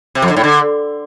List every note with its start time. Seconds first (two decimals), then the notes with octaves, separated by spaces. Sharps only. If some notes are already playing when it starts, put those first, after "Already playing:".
0.15 C3
0.22 F2
0.29 D3
0.37 A2
0.44 D3